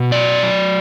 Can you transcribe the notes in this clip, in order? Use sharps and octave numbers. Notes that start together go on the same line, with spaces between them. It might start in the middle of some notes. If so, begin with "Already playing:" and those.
Already playing: B2
F#3 D5
F#3